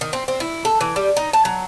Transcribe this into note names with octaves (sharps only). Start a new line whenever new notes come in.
D#3
C4
C4
E4
A4
E3
G3
D#4
A5
F#3